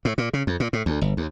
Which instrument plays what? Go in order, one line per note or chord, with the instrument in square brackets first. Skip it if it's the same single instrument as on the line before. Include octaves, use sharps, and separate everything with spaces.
[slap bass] A2
A#2
C#3
F2
A#2
A2
D2
G1
D#2